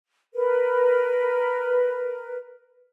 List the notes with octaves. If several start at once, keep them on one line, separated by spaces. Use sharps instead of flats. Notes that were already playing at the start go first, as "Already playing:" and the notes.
A#4 B4